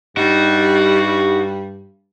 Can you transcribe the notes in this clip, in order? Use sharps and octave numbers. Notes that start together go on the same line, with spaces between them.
G2 G3 D#4 F#4